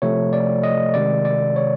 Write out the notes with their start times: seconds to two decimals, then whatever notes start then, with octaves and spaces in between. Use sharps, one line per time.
0.02 C3 F3 A3 C#5
0.33 D5
0.64 D#5
0.94 C3 D#3 G#3 D5
1.25 D5
1.56 C#5